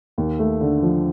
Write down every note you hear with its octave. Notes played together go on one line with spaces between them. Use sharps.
D#2
A3
D3
F3